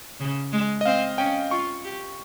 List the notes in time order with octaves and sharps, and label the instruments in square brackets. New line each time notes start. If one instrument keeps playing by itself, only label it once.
[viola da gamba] C#3
G#3
[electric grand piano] D#5
[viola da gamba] C4 [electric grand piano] F5
[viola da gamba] C#4 [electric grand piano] G5
[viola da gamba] F4 [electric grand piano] C#6
[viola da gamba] G4